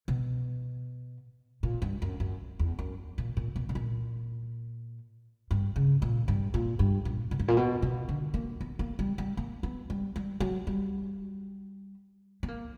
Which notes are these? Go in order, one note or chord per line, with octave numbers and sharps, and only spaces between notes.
B2
A#2
G2
F#2
F#2
E2
F#2
A#2
A#2
B2
B2
A#2
G2
C#3
A#2
G2
A#2
G2
A#2
B2
G2
A#2
B2
B2
D3
A#3
B3
A#3
G3
G3
A#3
B3
G3
G3
F#3
G3
B3
A#3